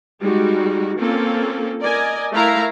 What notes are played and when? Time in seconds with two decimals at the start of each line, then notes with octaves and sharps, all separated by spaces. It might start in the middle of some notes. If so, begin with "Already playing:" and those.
0.20 G3 G#3 D#4 F#4
0.98 A#3 C4 C#4 F4 A4
1.80 A#4 D5 D#5 G#5
2.32 A3 E4 A#4 E5 F5 A#5